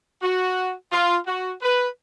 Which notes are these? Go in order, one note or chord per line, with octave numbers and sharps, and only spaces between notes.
F#4
F4
F#4
B4